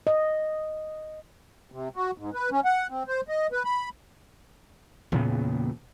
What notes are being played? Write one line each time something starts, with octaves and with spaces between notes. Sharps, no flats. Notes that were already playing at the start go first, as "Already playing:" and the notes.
D#5
C3
F#4
G#2
B4
C#4
F#5
C4
C5
D#5
B4
B5
E2 A#2 C#3 B3